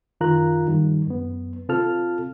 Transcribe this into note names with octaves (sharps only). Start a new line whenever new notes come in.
F#2 D#3 F4 A#4 A#5 F#6
G2 D#3 G3
F#2 B3
C3 C4 F4 A4 A5 F6